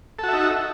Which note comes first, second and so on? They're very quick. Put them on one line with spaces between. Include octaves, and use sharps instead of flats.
A4 F#4 E5 D#4